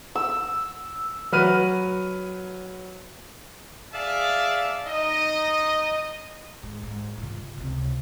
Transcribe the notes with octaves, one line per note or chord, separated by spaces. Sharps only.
E6
F#3 B4 F6 D#7
G#4 D5 E5 F5 A5
D#4 D#5
G#2
G#2
C#3 F4
C#2 C3